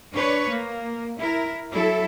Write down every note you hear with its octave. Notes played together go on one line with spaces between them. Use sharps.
D4 B4 C#5
A#3
E4 A#4
F#3 E4 A4